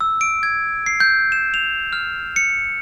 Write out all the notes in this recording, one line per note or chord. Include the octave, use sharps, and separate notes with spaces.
E6
D7
G#6
C7
G6
E7
F7
F6
C#7